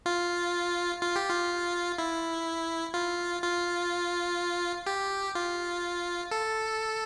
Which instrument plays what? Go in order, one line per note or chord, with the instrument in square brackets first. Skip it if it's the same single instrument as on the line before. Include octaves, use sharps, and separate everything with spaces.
[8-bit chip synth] F4
F4
G4
F4
E4
F4
F4
G4
F4
A4